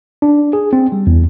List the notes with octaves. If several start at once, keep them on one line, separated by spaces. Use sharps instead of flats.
D4
G#4
C4
G3
E2